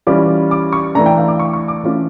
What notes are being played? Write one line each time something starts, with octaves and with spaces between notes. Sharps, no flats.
E3 G3 C#4 F4 D6
D6
C#6
E3 A3 D4 A#5
G5
F5
D6
C#6
C#6
D6
E3 A3 C#4 F4